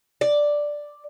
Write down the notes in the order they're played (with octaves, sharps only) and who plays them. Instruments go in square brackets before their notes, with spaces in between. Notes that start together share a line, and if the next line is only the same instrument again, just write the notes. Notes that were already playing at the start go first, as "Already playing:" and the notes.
[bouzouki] D5